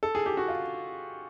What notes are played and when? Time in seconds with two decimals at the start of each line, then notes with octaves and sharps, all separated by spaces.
0.03 A4
0.15 G#4
0.26 G4
0.37 F#4
0.48 F4